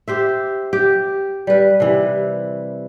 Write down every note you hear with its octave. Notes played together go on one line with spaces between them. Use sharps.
G4 C5 E5
G4
G3 B4
C3 E3